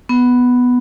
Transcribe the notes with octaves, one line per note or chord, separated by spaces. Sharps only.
B3